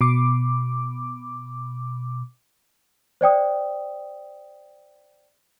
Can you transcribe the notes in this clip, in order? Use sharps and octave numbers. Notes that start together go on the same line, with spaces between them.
B2 D6
C5 D5 G5 D#6